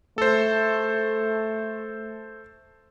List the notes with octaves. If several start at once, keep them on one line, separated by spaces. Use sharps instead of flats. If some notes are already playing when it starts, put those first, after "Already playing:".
A3 A4 C5